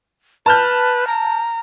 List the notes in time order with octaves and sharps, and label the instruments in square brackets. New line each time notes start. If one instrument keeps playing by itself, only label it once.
[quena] B4 [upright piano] A5 F6 G6
[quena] A#5